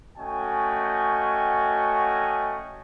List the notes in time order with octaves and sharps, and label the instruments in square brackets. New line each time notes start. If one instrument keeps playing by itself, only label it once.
[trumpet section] A3 C#4 F#4 D#5 G5 G#5